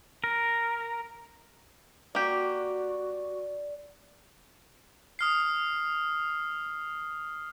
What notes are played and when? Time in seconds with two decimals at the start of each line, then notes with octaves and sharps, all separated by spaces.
0.24 A#4
2.15 A#3 F#4 G4 D5
5.19 D#6 F6 C7